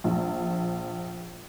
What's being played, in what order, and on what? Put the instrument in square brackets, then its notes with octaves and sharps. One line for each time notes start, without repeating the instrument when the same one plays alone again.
[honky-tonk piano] A#1